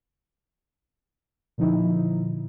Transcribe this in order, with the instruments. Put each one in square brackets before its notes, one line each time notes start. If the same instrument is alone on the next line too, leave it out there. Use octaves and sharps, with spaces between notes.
[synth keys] A#2 D3 F3 D#4 E4